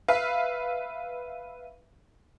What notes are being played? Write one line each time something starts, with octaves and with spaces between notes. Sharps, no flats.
B4 E5 F5